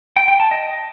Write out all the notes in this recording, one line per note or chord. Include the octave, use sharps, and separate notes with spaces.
G5
G5
A5
D#5